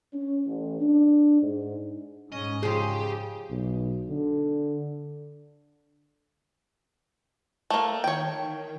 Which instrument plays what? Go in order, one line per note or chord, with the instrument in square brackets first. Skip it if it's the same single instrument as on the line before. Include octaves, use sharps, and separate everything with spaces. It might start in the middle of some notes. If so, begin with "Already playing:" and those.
[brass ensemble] C#4
A1
D4
G#2
[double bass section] G#2 [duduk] C#4 [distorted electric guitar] D#5
[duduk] C#3 [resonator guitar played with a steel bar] F3 G#4 [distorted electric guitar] G4
[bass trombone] B1
D3
[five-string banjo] A3 A#3
[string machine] D#3 [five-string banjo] C#5 G5